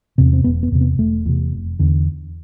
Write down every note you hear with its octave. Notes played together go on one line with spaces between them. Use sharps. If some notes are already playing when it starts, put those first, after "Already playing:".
E2 C3
C4
E1 B3
B3
E2 C3
B3
E1 A3
E2 C3
F1
E2 D3